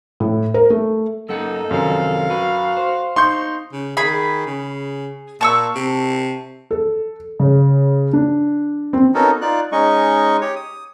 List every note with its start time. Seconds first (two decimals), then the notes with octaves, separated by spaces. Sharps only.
0.20 A2
0.54 A#4
0.70 A3
1.29 F#2 A#3 D#4 A4 F#5
1.71 F#2 C3 D#3 F3 F5
2.30 F#4 B4
2.77 C5
3.16 D#4 C6 C#6 G6
3.72 C#3
3.97 D#3 G#4 B5
4.46 C#3
5.41 A#2 A5 C#6 E6
5.75 C3
6.71 A4
7.40 C#3
8.13 D4
8.93 C4
9.14 B3 C#4 D#4 F#4 A4 A#4
9.41 D#4 F4 D5 F#6
9.72 G#3 C#4 D#4 D#5 C#6
10.41 G4 C#5
10.56 D#6